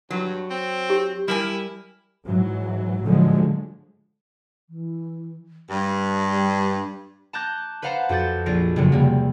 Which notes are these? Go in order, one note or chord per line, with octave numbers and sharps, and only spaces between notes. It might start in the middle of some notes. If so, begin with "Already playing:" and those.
G2 F#3
C4
G4
G3 E4 A#4 G#5
G#2 E3 F#3
A2 D3 F3 F#3 G#3
E3
G2 G3
A5 A#5 D6 F#6 G6 A#6
B4 C5 F5 F#5 A5 A#5
F2 F#4 D6 G6 A6
A#1 F4 A#6 D7
F#1 E2 F#3
C3 G3 A#3